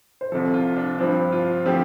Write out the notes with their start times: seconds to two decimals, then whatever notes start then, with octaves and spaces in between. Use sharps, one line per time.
0.21 C5
0.32 C2 C3 F3 A4
0.54 F4
0.76 D4
0.98 G2 F3 C4 D4
1.32 F4
1.66 D3 F3 C4 G4